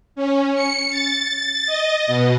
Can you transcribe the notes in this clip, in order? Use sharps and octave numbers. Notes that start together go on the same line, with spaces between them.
C#4
C#7
A6
D#5
B2